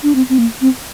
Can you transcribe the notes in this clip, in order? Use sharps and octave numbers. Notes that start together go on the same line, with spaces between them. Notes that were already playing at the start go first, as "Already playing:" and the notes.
D4
C4
C4
A#3
C4